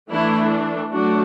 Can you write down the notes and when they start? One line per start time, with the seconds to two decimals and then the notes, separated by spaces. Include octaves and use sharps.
0.10 E3 A3 D4 E4
0.93 F#3 A3 D4 F#4